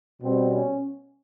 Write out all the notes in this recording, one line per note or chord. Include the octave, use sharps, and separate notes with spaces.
B2 G3 C4
C#4